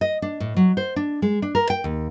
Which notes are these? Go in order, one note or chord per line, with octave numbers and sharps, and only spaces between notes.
D#5
D4
A2
F#3
C5
D4
G#3
D4
A#4
G5
D#2